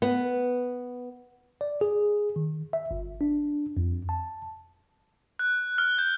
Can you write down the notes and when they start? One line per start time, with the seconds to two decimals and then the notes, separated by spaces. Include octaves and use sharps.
0.02 B3
1.61 D5
1.81 G#4
2.36 D#3
2.73 E5
2.91 G1
3.21 D4
3.77 F2
4.09 A5
5.39 F#6
5.78 F6
5.98 G6